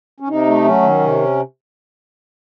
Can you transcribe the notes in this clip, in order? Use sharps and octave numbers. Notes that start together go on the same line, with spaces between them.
C#4
C3 D#4
A3
F#3 C#4
D#3
C3